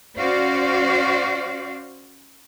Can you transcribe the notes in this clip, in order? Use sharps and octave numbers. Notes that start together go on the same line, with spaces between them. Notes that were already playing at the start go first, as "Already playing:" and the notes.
C#4 F#4 C5 D5 F5